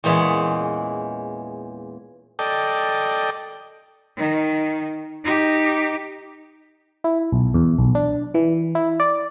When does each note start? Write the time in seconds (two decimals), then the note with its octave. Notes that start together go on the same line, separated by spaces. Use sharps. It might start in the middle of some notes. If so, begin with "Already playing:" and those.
0.04 E2 A#2 E3 G#3 C#4
2.39 A4 D5 D#5 G5
4.17 D#3
5.24 D#4 G4
7.04 E4
7.32 B1
7.54 E2
7.78 B1
7.95 D4
8.34 E3
8.75 E4
9.00 D5